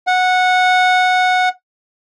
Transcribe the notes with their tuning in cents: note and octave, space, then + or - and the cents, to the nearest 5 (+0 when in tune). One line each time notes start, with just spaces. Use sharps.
F#5 -10